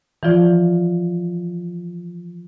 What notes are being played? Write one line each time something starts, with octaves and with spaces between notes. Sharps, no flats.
E3 F3 F4 D5